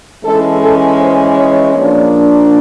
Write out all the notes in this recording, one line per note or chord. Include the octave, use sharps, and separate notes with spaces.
E3 G#3 C#4 A4
A4
C5
C#5
F3 A#3 D4